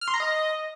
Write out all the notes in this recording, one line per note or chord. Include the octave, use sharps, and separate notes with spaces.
F6
C6
A#5
D#5